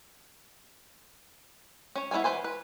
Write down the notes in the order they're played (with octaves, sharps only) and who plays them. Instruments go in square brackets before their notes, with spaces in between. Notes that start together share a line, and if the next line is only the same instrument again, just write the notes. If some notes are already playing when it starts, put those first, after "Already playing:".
[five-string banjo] C#4 C#5
B3 E4 B4 C#5 G#5
E3 B4 C5 G#5
B4